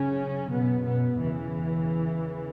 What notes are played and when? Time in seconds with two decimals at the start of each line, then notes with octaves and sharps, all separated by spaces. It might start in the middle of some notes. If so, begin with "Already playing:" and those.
Already playing: F#2 C#3 C#4
0.50 B2 B3
0.85 B2 B3
1.20 E2 C#3 E3